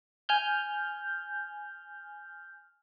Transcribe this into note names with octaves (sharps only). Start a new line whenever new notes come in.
G#5 F6 G6